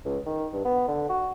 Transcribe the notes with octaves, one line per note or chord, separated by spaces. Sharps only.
C#2
D#3
G2
B3
D3
F#4